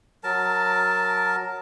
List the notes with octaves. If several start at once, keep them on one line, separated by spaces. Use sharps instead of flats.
F#3 A#4 A5